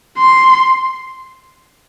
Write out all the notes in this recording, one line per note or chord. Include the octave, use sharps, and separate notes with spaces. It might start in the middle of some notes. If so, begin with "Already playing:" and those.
C6